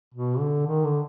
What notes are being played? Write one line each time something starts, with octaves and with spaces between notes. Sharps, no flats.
B2
D3
D#3
D3